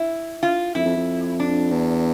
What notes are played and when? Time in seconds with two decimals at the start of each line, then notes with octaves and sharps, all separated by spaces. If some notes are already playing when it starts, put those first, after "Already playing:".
Already playing: E4
0.43 F4
0.75 F2 E4
0.85 F2
0.97 F2
1.40 D4
1.71 E2